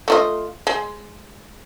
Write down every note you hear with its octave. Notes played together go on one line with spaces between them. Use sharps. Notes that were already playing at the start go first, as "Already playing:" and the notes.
A3 F4 D#5
G#3